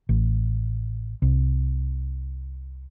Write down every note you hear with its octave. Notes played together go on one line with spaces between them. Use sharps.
A1
C2